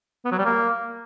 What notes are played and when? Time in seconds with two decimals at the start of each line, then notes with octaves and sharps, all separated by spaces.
0.25 B3
0.32 F#3
0.38 G3
0.45 A#3